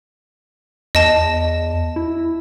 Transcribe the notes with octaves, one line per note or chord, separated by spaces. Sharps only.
E2 D#5 A5
E4